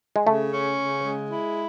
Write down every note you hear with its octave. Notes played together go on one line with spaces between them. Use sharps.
G#3
C#3 A3
C#4
C#3
G#3
E4